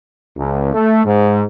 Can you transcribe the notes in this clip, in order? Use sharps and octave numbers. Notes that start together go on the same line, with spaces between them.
C#2
A3
G#2